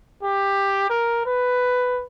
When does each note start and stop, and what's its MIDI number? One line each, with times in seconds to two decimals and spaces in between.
0.23 0.85 67
0.90 1.23 70
1.26 2.04 71